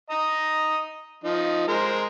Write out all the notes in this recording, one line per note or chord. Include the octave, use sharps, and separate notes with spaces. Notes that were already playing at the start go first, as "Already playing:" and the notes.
D#5 A#5
F3 D#4
G#3 A#4 C5